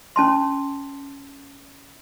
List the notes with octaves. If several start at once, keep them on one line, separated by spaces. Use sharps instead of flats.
C#4 A5 C6